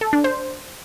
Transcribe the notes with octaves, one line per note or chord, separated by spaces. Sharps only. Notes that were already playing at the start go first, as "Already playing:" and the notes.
A4
D4
C5